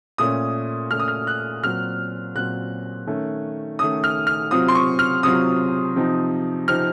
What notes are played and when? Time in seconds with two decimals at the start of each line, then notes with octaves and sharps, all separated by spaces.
0.18 A#2 A3 C#4 D#6
0.90 A#2 A3 C#4 F6
1.00 D#6
1.08 F6
1.27 F#6
1.63 A#2 F#3 C4 F6
2.35 A#2 F#3 C4 F#6
3.07 D#3 A3 C#4
3.79 D#3 A3 C#4 D#6
4.04 F6
4.27 F6
4.51 C3 F#3 C4 F4 D#6
4.68 C6
4.75 C#6
4.99 F6
5.23 C3 F#3 C4 F4 D#6
5.96 C3 F3 C4 D#4
6.68 C3 F3 C4 D#4 F6